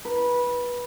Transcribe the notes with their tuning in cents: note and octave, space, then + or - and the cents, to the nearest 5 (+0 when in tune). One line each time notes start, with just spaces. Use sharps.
B4 -20